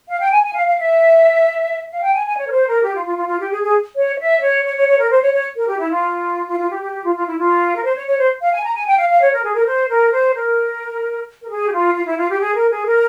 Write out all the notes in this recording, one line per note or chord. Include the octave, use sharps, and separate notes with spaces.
F5
G5
G#5
G#5
F5
F5
E5
F5
G5
G#5
G#5
C#5
A#4
C5
A#4
G4
F4
F4
F4
F4
G4
G#4
G#4
C#5
C#5
E5
C#5
C#5
C#5
C#5
A#4
C5
C#5
C#5
A#4
G4
E4
F4
F4
F4
G4
G4
G4
F4
F4
E4
F4
A#4
C5
C#5
C#5
C5
F5
G#5
A#5
G#5
G5
F5
F5
C#5
A#4
G#4
A#4
C5
A#4
C5
A#4
A#4
G#4
G4
F4
F4
E4
F4
G4
G#4
A#4
G#4
A#4